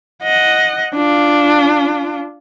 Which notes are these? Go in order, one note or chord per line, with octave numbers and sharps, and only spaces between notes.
D#5 F#5
D4 F4